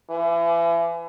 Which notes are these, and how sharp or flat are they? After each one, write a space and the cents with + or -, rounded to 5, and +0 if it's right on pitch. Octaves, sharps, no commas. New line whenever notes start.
E3 +35